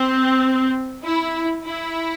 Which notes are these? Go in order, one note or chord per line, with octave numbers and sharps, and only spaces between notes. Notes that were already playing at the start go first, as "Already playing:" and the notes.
Already playing: C4
E4
E4